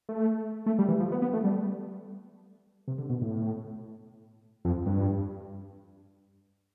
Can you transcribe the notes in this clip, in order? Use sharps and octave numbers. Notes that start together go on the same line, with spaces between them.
A3
A3
G3
E3
F3
B3
B3
A3
G3
C3
D3
B2
A2
F2
G2